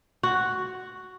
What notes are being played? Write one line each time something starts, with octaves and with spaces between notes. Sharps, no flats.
F#4